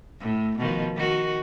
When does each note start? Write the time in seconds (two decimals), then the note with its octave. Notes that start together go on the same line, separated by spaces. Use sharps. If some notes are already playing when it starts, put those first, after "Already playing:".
0.21 A2
0.58 B2 D#3 F3
0.96 D#3 F#4